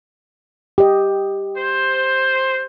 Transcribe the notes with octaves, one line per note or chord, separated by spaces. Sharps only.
G4 D#5
C5